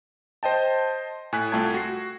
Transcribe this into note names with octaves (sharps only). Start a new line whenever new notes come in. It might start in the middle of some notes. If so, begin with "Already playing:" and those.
C5 D#5 G5 A5
A2 G#5 F#6 B6
C2 A3 F4 G5 A5 G#6
F#4 C7